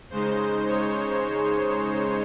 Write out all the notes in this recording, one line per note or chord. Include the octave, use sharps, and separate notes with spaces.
C#3 G#3 D#4 C5
C#5